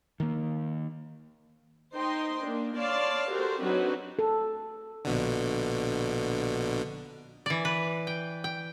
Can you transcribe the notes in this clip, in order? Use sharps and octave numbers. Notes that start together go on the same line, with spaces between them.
D#3 A#3
D#4 C5 D#5 G5 C6
A#3 D4
C#5 D5 F5 A5 C6
F#4 G4 A4 A#4 C5
F#3 C4 D4 D#4 F#4 B4
A4
A#1 B2 D3
E3 D5
B4
G5
G5